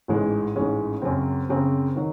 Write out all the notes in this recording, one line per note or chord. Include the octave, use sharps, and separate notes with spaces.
A1 G#2 E3 G#3 C#4
A1 G#2 E3 G#3 C#4
F#2 C#3 F#3 C4
F#2 C#3 F#3 C4
D#3 F#3